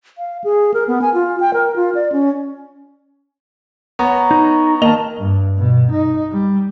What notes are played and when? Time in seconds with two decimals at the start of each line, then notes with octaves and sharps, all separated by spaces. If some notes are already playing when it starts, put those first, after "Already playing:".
0.18 F5
0.44 G#4
0.74 A#4
0.88 B3
1.02 G#5
1.14 F4
1.40 G5
1.54 A#4
1.76 F4
1.95 D5
2.12 C#4
3.99 B3 C#5 A#5
4.31 D#4
4.82 D#3 A#3 D#5 A5 F7
5.19 G2
5.57 B2
5.91 D#4
6.32 G3